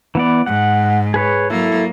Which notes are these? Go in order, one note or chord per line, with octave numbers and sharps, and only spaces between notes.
E3 B3 D5
G#2 F#5
G#4 B4 C#5
F#3 A#3 E4 A4